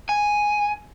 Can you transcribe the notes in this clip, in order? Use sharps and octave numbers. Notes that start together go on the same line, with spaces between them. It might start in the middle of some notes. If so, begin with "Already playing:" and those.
G#5